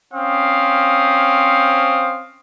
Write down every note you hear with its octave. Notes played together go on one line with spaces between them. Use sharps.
C4 C#4 C5 F5 D#6